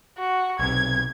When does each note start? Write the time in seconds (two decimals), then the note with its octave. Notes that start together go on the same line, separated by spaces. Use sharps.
0.18 F#4
0.59 B1 C3 G#6